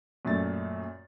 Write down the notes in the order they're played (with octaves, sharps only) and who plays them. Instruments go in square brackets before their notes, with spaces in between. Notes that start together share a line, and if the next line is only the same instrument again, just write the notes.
[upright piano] F#2 A#2 A3 A6